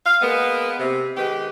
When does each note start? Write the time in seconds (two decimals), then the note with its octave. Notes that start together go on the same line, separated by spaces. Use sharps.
0.05 F5
0.22 G#3 A#3 B3
0.79 C3
1.16 D#3 G#3 B3 G4